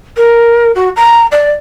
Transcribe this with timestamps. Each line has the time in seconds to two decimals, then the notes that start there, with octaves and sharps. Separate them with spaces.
0.17 A#4
0.75 F#4
0.96 A#5
1.32 D5